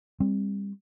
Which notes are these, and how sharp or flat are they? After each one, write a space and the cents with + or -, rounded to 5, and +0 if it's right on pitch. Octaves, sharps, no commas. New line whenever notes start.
G3 +30 C4 +25